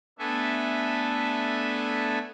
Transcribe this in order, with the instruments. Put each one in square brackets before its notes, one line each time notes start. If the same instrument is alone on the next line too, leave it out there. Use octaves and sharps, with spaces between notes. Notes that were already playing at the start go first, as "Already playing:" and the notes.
[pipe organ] A3 B3 D4 A4 E5 G#5